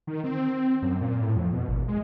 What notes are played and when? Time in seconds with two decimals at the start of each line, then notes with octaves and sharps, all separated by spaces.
0.07 D#3
0.24 C4
0.82 F#2
1.01 A#2
1.21 A2
1.36 F2
1.53 B2
1.69 G#1
1.88 G#3